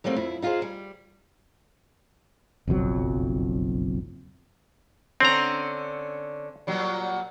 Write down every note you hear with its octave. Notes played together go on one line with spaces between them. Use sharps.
F#3 G3 A3 A#3 C4
F2 E4
D#4 F4 G4 G#4 C5
G3
F#1 B1 F2 F#3
D3 C4 C#4 A#5
A#2 F#3 G3